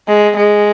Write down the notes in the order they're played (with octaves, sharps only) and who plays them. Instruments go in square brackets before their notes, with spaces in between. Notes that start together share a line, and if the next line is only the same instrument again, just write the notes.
[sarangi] G#3
G#3